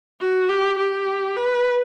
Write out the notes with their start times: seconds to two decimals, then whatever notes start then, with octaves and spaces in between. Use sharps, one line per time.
0.21 F#4
0.49 G4
0.79 G4
1.37 B4